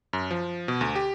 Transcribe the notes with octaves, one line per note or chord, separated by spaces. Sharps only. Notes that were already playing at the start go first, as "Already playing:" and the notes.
F#2
F3
B2
D2
G4